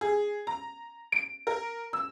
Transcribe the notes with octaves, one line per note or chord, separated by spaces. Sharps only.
G#4
A#5
D7
A#4
E6